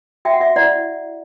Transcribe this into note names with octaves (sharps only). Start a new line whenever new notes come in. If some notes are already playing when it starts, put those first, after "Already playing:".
F#4 E5 G5
F#5
F#4 E5
E4 D5 F#5